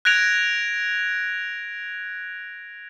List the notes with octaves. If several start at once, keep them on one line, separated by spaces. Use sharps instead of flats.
F#6 G#6 A#6 D7 F7